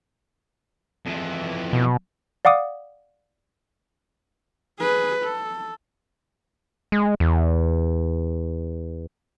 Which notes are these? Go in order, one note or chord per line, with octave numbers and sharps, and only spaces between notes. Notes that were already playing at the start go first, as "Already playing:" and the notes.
F2 E3
B2
D5 F5 F#5 D6 D#6
G#4 B4
A4
G#3
E2